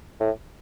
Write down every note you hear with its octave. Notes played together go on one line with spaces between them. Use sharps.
A2